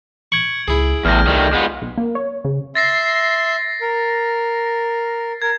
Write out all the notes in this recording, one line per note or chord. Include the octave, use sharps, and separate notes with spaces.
C#6 G#6 D7 F#7
C#2 E4 G#4
A1 E2 A2 F6 G6 A#6
C2 D#3 G3 A3
G#3 B3 F4
B1
A#3
C#5
C#3
E5 C6 A6 A#6 C7
A#4
A#4 G#6